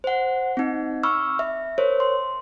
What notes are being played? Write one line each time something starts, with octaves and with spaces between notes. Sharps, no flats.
C5 F#5
C4 D#4
B5 C#6 D6 E6 F6
E5
A#4 C5 C#5
C6